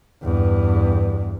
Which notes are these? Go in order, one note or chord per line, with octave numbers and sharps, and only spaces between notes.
E2 G2